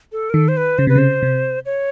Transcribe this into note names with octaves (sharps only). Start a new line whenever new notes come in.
A4
A#4
D#3 A4
C5
B4
C#3 C5
C3 B4
C#3 C5
C3
C#5